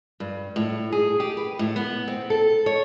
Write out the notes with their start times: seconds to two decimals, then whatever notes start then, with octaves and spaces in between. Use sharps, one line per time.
0.20 G2
0.56 A2
0.92 G#4
1.20 G4
1.37 B4
1.59 A2
1.76 B3
2.08 C4
2.30 A4
2.66 C#5